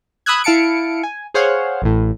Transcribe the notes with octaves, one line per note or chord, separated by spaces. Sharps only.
B5 D#6 E6 F#6 G#6
E4 F5 A5 C#7 D7
G#5
G#4 C5 C#5 F5 F#5
A1 A2